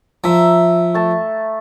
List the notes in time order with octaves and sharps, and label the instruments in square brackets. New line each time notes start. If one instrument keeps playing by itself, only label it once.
[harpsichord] F3 [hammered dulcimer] E5 A#5
[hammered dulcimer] A3 A5